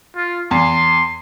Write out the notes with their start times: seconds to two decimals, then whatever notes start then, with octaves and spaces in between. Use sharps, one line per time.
0.16 F4
0.51 E2 C6